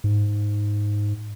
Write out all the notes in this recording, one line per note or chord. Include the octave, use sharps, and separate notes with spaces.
G#2